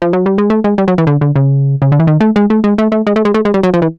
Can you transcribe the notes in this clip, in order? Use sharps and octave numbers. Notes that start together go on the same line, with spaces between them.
F3
F#3
G3
G#3
A3
G#3
G3
F#3
E3
D3
D3
C#3
C#3
D3
E3
D#3
A3
G#3
A3
G#3
A3
A3
G#3
A3
G#3
A3
G#3
G3
F#3
F3
E3